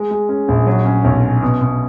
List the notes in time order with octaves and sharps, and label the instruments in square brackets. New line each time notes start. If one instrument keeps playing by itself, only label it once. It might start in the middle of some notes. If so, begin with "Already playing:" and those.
Already playing: [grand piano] G#3
G#3
C#4
A#1
F#3
C#4
B1
C#4
B2
B2